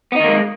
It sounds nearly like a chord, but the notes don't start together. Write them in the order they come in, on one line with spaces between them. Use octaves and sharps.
B3 D#4 D#3 A#3 G#3